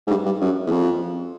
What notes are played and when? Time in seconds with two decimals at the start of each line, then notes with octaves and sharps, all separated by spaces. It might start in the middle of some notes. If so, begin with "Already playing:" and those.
0.07 G#2
0.10 G2
0.26 G2
0.41 F#2
0.67 E2
0.71 F2